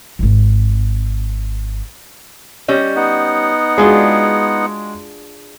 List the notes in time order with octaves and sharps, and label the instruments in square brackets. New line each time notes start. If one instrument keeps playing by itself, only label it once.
[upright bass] D#1 G#1
[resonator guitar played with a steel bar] G3 C#4 D#5
[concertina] B3 D#4 F#5
[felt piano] G#3 F#4 [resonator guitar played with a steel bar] D4 F4 G#4